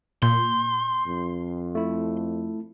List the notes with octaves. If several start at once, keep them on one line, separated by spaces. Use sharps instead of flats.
A#2 C6 G6
F2
A3 E4